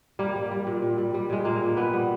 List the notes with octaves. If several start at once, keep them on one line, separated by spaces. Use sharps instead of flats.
G3 A#3
G3
G3
A#2
A#2
G3
G3
A#2 G#3
A#2 A#3
G3
A#2 B3
G3